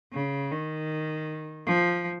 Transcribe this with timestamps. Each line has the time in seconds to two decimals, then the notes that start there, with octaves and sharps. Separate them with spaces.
0.13 C#3
0.52 D#3
1.67 F3